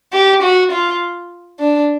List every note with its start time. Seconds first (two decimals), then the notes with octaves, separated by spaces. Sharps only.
0.13 G4
0.43 F#4
0.72 F4
1.59 D4